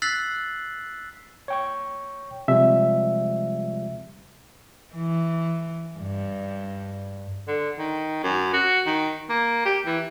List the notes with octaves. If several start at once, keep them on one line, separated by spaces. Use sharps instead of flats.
E6 F#6 A6 B6 C7 F#7
C#5 G5 C#6
C3 F3 G3 G#3 E5
E3
G2
D3
D#3
F#2
F#4
D#3
A#3
G4
E3